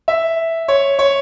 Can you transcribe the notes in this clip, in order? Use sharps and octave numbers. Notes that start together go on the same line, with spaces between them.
E5
C#5
C#5